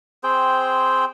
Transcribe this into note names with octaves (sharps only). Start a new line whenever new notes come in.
C4 G#4 C5 G5